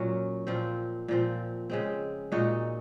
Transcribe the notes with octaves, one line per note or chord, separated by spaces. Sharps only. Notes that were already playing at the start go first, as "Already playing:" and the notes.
Already playing: A#2 F#3 C#4 F#4
A#2 F3 C4 F4
A#2 F3 C4
C#3 G#3 C4
A#2 G#3 D#4 F#4